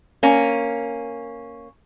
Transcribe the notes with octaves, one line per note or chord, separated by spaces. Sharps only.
A#3 C#4